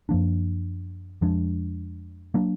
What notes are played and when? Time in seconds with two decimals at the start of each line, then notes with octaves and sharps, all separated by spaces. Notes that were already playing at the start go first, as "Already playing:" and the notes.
0.09 F#2 F3 A#3 D4
1.21 F2 F3 G#3 D4
2.34 F#3 A#3 D4